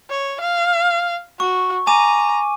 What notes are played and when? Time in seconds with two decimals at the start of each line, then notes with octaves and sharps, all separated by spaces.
0.10 C#5
0.41 F5
1.40 F#4 C#6
1.87 G#5 A#5 D6 D#7